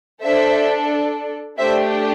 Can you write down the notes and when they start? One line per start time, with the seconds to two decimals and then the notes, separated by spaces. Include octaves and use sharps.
0.22 D4 A4 C5 E5
1.58 A3 D4 G4 C5 E5